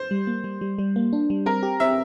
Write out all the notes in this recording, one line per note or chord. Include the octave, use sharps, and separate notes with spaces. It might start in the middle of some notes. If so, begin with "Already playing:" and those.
Already playing: C5
G3
A#3
G3
G3
G3
A#3
D4
G3
C4 A#4
G4
C4 E5